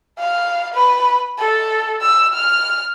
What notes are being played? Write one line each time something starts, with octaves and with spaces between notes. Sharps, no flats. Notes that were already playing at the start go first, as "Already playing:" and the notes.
F5
B4
A4
E6
F6